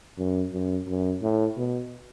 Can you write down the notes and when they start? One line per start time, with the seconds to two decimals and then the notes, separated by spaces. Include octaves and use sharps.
0.18 F#2
0.53 F#2
0.88 F#2
1.22 A2
1.57 B2